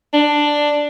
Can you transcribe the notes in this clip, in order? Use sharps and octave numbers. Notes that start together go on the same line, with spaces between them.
D4